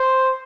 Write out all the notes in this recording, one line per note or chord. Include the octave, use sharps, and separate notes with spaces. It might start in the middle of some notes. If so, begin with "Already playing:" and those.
Already playing: C5